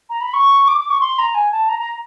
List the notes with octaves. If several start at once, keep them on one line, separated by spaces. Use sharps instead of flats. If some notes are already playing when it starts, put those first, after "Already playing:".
A#5
B5
C#6
D6
D6
C#6
C6
A#5
G#5
A5
A#5
A#5